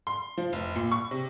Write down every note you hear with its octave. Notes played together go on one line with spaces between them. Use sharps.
C6
F3
F1
A#2
C#6
C3